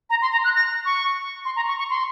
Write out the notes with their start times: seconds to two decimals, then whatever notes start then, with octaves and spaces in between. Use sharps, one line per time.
0.10 A#5
0.22 C6
0.32 A#5
0.44 F#6
0.56 A#6
0.86 C#6
1.45 C6
1.56 A#5
1.68 C#6
1.79 C#6
1.90 C6